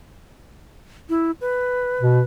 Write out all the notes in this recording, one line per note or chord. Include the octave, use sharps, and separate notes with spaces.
E4
B4
B2